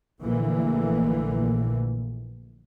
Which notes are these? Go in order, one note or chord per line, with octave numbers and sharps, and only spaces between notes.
A#1 A#2 D3 E3 A3 A#3